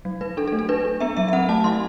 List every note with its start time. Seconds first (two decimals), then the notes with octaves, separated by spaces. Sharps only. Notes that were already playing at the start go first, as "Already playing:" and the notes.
0.05 F#3
0.21 F#3 B4
0.37 D4 A4
0.48 A4
0.52 A3
0.59 A4
0.69 D4 B4
0.85 D4
1.00 B3 E5
1.17 F#3 E5
1.28 E5
1.33 C4 F#5
1.49 A3 A5
1.64 F#3 C6